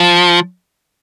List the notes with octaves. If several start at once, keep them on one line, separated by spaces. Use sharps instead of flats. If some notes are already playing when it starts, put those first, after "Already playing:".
Already playing: F3